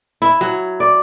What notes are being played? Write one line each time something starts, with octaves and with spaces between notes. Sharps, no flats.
E4
F#3
D5